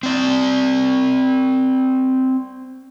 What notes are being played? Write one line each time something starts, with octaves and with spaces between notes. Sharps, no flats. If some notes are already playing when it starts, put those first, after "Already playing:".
C4 D5